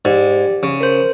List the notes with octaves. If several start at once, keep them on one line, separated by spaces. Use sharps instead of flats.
G#2 G4 D5
C#3
A#4 C5